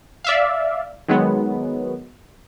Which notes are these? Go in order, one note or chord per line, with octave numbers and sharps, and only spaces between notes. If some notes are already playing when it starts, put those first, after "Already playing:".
D5 E5 F5
D#3 F#3 G#3 B3